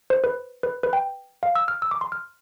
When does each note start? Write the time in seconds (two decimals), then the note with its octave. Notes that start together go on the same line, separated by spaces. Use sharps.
0.10 C5
0.24 B4
0.63 B4
0.83 B4
0.93 G5
1.43 F5
1.55 E6
1.68 F6
1.82 E6
1.91 D6
2.01 C6
2.12 F6